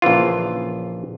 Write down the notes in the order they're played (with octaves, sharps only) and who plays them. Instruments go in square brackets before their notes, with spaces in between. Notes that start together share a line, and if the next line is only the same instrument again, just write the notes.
[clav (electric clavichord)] A#1 C#3 E3 F4